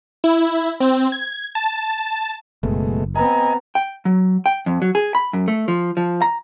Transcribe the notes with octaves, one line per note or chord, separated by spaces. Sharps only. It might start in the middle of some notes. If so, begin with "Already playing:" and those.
E4
C4
G#6
A5
F#1 B2 G#3 A3
B3 C4 D#5 G#5 A#5
G5
F#3
G5
F2
F#3
G#4
B5
F#2
A3
F3
F3
A#5